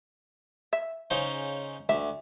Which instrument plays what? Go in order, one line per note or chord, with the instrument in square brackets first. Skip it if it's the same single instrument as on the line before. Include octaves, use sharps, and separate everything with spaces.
[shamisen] E5
[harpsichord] C#3 D#4 C5
[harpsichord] D2 [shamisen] E5